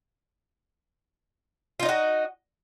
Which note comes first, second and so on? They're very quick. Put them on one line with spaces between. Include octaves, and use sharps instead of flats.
F4 D#4 D#5 F#4